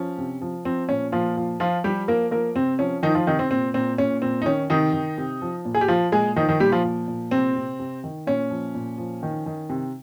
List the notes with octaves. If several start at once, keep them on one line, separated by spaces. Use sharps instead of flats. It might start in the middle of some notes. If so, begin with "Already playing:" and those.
Already playing: F3 C#4
C3
F3
F3 C4
A#2 C#4
A#2 F3 F4
F3
F3 F4
F3 G3 G4
F3 A#3 A#4
F3 A#3 A#4
C3 C4
F3 C#4
D#3 F3 D#4
F3 F4
C3 D#3 D#4
C4
A#2 C4
A#2 C4
A#2 C#4
A#2 C4
D#4
D#3 C#4
C3 D#3 D#4
D#3
C3
F3
A#2
G#4
G4
F3 F4
A#2 G#3 G#4
D#3 F3 D#4
D#3 D#4
A#2 G3 G4
F3 F4
F3
A#2
C3 C4
C3
C3
D#3
A#2 C#4
F3
A#2
F3
D#3
D#3
C3